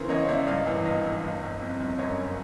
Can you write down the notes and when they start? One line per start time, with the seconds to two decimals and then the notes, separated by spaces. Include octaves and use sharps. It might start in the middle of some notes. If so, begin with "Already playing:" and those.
Already playing: C#3 E3 A#4 C5
0.09 C#2 C#5 D#5
0.29 C#2 D5 E5
0.47 G2 D#5 F5
0.67 E3
0.85 G#1 D#5 F5
1.04 E3
1.24 G1
1.43 G1
1.61 F2
1.80 G1
1.99 F#2 C#5 D#5
2.18 F#1